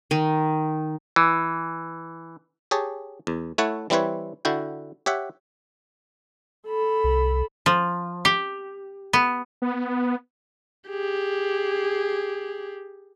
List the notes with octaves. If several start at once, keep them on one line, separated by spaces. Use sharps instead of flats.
D#3
E3
G4 G#4 C#5 A5
E2
A3 E4 C#5 F#5 A5
E3 G3 C4 E4 B4 C#5
D3 E4 F#4 G5
G4 C#5 E5 F#5
A4 B5
C2
F3
G4
B3
B3
G4 G#4